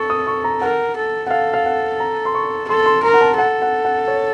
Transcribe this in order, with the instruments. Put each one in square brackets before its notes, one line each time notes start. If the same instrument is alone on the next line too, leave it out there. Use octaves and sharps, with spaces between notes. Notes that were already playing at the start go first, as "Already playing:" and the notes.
Already playing: [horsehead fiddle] A4 [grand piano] C#6
[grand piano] D#6
C#6
A#5
[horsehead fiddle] A#4 [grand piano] F#5
[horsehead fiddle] A4
[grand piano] F#5
[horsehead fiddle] A4 [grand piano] F5
[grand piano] F5
F#5
A#5
C6
C#6
[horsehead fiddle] A4 [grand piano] C6
[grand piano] C6
[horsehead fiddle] A#4 [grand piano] A#5
[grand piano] F#5
A5
[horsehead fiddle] A4 [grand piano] F#5
[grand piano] F#5
F#5
C#5